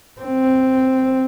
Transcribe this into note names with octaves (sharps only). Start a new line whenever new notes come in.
C4